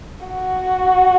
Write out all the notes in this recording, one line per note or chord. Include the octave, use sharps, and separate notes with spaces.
F#4